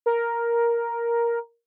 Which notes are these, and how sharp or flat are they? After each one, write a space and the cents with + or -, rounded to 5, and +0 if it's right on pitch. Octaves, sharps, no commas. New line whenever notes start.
A#4 +5